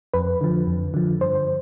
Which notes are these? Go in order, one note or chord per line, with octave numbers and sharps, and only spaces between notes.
F2 B4
D3 F3
F2
D3 F3
G2 C5